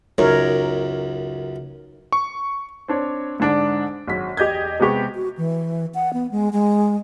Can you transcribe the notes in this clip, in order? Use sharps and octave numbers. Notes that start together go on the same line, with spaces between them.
C#2 F#2 D#4 A#4 C#5
C#6
C4 D4 C#5
G#2 D3 D4 D5 D7
G#1 F#3 B6
E1 G4 D#5 G6 G#6
C3 G#3 B3 G4 C#6
F#4
E3
F#5
B3
G#3
G#3